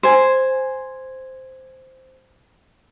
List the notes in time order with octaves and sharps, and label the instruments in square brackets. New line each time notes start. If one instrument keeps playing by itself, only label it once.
[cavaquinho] C5 G#5